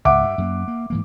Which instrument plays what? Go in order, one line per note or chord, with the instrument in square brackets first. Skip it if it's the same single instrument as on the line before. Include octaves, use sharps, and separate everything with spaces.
[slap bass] C#2 G#2 [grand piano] E5 F#5 D6
[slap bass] G2
F#2 D#3 A#3
A#3
G#2 E3 A#3